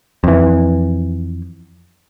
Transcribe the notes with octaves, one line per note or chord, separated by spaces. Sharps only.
F2 E3